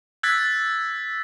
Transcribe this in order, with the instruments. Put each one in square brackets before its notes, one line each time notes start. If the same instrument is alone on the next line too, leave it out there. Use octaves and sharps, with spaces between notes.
[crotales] E6 F#6 G#6 A6 B6